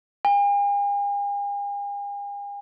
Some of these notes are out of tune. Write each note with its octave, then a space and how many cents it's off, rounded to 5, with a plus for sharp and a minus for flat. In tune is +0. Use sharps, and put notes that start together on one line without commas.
G#5 -45